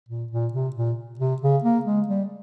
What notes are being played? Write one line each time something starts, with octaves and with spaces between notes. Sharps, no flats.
A#2
A#2
C3
A#2
C3
C#3
A#3
G#3
G3